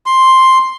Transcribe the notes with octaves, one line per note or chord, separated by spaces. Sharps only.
C6